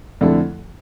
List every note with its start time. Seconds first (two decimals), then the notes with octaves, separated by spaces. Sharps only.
0.21 F2 D3 A3 E4 A4